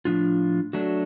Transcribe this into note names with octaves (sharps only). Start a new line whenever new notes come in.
A2 F3 G#3 D4 F4
F#3 A3 D4 F#4